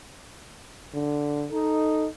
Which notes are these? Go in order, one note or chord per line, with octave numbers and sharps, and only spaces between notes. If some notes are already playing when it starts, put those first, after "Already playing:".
D3
D#4 A4